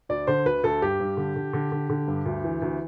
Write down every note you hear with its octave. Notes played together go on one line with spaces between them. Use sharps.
D2 D5
D3 C5
D2 B4
D2 A4
G2 G4
G2
D3
D3
D3
D3
D3
G2
D2
E3
D2